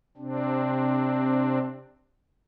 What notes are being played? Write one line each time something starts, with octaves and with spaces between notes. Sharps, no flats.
C3 C4 D4